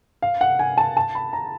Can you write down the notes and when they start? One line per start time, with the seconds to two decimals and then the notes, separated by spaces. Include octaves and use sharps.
0.22 F5
0.41 F#5
0.59 G#5
0.78 A5
0.97 A5
1.15 B5
1.33 A#5